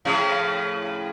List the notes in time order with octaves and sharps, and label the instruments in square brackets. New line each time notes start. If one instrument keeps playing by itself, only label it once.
[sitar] A2 C#3 F3